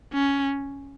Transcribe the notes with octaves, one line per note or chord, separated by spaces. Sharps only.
C#4